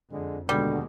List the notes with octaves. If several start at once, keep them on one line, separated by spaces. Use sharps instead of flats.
F2 D3 G#3
D#2 B2 D3 D#3 G3 G#3